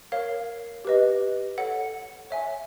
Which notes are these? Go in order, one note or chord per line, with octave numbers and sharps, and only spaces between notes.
A#4 C#5 F5
G4 B4 D#5
A4 C#5 F#5
C#5 E5 G#5